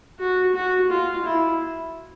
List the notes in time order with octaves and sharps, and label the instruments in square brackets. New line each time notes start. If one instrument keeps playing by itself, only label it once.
[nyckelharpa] F#4
F#4
F4
E4